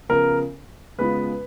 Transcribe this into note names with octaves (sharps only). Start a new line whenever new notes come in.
C#3 F3 B3 A#4
C#3 G#3 B3 F4 B4